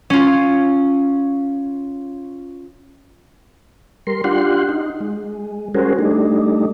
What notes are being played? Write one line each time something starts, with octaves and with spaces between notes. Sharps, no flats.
C#4 F4
G3 A#4 C6
D4 F4 G4 F#5 C6
D#4
G#3
G3 C#4 F#4 G#4 A#4 C5
G3 A3 D4 D#4